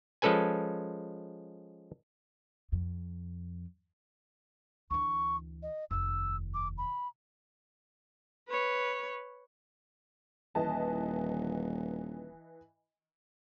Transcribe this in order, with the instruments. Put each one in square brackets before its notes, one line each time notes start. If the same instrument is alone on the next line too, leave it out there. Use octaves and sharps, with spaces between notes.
[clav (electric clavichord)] F3 G#3 C#4 A4 B4 G#5
[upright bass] F2
[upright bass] D2 E3 [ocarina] C#6
[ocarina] D#5
[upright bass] F1 D#2 [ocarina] E6
[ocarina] D6
B5
[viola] B4 C#5
[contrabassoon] D#1 [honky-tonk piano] E3 D#5 A5